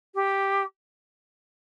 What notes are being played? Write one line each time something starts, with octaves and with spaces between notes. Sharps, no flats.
G4